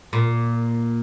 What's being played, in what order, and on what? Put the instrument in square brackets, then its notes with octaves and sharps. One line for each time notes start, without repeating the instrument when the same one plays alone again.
[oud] A#2